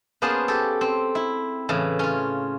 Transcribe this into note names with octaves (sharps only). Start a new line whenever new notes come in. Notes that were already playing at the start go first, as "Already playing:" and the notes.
A#3 B3 C#4 G#4 C5 A5
G4 A4
C4
E4
A2 C#3 E3
C#4 F4